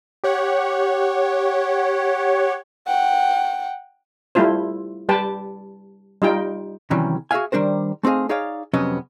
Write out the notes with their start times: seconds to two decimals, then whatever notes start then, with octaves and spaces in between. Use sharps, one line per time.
0.24 G4 C#5 F#5
2.87 F#5 G5
4.35 G3 A3 E4 F4 C5
5.09 G3 G4 B4 G5 A5
6.22 G3 D#4 F4 G5
6.91 C3 D#3 E3 F#3 G3 C#4
7.31 F#4 G#4 B4 E5 F5 G#5
7.52 D#3 G3 D4 A#4 C5
8.03 A3 C4 D#4 G#4 F5
8.29 D#4 G#4 C#5 D5 F5
8.73 F2 C3 F#3 B3 C#4 D#5